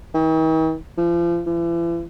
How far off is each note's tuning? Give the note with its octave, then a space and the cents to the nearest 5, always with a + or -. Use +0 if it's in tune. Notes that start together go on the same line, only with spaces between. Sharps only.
D#3 +45
F3 -35
E3 +40